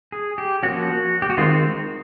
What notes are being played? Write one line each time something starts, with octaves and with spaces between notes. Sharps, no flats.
G#4
G4
F3 A#3 C#4 F#4
G4
F#4
D#3 G#3 C4 F4